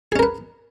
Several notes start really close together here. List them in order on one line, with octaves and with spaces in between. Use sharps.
G#4 C#4 A#4 B4